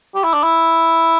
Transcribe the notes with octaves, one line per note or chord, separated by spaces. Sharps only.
G4
E4
D4
E4